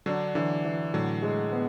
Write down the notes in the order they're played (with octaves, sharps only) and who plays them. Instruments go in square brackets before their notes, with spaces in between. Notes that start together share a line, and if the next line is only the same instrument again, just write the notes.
[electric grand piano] D3 F#3 [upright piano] D4
[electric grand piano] D3 F#3 [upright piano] E3
[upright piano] E3
[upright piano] A2 [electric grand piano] D3 F#3
[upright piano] G#3
B3